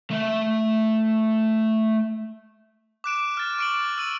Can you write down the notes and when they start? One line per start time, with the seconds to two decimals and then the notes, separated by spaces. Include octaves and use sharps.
0.11 A3 E5
3.04 D6 F#6 D7 E7
3.37 F6 A6
3.58 C#6 D7 F#7
3.98 E6 D#7 F#7